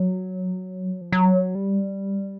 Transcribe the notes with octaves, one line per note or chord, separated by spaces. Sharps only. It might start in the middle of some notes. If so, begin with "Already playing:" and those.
Already playing: F#3
F3
F#3
G3